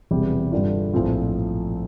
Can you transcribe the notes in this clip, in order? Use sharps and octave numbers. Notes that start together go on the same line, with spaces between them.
E1 E2 C3 G3
G2 D3 G3 D4 F4
A#1 A2 F3 C4 F4